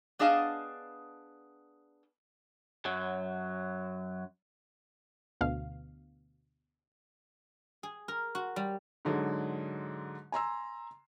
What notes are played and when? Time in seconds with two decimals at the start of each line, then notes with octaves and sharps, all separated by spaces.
0.19 B3 D4 G#4 D#5 F5 A5
2.85 F#2 F#3
5.41 D2 B2 F5
7.83 G#4
8.08 A#4
8.35 F#4
8.56 G3
9.05 G#2 D3 F#3 G#3
10.32 G#5 A#5 C6 E6